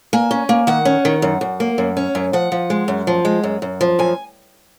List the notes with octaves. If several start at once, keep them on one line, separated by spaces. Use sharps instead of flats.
A#3 G#5
C#4
A#3
D#3 F#5
C#4
D#3
F#2
F#2
A#3
F#2
C#4
F#2
F3 F#5
F3
G#3
F#2
F3
G#3
F#2
F#2
F3
F#2 G#5